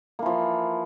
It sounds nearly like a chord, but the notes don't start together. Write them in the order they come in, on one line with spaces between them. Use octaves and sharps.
A#3 E3 F3